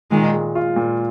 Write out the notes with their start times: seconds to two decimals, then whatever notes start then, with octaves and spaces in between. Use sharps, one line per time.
0.11 A#2 D#3 G#3
0.33 G#3
0.55 F4
0.76 A#2